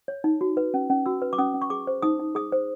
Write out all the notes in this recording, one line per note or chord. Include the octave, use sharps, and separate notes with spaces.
C#5
D#4
F#4
B4
C#4
C#4
F#4 E6
B4
D6
C#4 D#6
C#4
C#6
G#4 D6
C5
D#4 D#6
D#4
G#4 D#6
C5